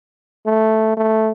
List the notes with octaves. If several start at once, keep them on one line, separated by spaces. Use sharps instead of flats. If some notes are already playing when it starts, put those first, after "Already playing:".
A3
A3